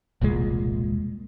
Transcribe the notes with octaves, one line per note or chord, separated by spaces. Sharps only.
E1 C2 A#2 G#3